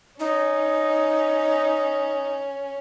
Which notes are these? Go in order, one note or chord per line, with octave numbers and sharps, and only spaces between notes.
C#4 D#4